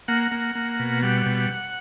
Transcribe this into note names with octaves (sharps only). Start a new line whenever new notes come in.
A#3 F#5
A#3
A#3
B2
G3 F#5
B2